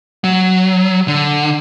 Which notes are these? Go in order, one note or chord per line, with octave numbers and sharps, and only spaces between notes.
F#3
D3